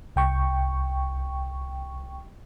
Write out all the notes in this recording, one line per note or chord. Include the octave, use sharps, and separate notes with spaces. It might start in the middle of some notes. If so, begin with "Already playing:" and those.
C2 G5 C#6